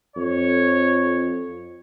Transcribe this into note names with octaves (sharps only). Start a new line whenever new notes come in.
F2 C#5